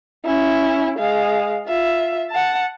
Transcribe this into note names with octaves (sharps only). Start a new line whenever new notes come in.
C#4 E4
G#3 F5
F4 E5
F#5 A5